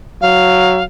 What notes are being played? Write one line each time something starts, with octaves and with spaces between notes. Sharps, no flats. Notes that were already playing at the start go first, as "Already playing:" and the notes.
F#3 F5